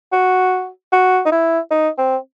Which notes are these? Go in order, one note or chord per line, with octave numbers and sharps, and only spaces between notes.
F#4
F#4
D#4
E4
D#4
C4